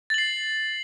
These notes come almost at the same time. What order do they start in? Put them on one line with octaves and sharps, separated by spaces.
A6 F#7 C7